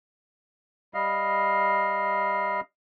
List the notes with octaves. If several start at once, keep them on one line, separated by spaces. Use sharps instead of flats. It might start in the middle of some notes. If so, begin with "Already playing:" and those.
G3 D#5 F5